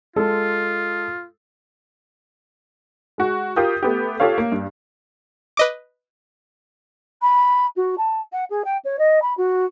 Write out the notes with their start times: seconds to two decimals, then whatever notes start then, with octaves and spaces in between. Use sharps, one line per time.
0.16 G#3 F4 A4
3.18 G#3 F#4
3.56 F4 G4 A#4 D#6 G6
3.83 A3 B3 G4
4.20 F4 G4 A4 C#5 F5
4.38 A#3
4.52 G2
5.57 B4 D#5 D6
7.22 B5
7.76 F#4
7.98 A5
8.32 F#5
8.50 G#4
8.64 G5
8.85 C#5
8.99 D#5
9.22 B5
9.37 F#4